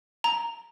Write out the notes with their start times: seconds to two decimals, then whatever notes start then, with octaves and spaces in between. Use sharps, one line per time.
0.24 A#5